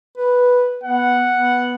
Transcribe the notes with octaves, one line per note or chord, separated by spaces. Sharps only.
B4
B3 F#5
B3